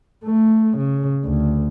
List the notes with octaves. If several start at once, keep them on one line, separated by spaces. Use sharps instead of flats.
A3
C#3
D2